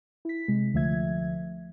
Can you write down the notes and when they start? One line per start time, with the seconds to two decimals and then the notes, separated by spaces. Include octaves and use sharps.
0.25 E4 B6
0.48 C3 G#3
0.73 D2 D3 F3 A3 E5 G#6